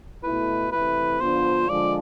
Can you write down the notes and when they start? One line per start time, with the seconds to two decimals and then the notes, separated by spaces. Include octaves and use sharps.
0.23 B2 A3 E4 B4
0.72 C3 E3 A3 E4 B4
1.20 D3 F3 B3 D4 F4 C5
1.69 D3 F3 G#3 D5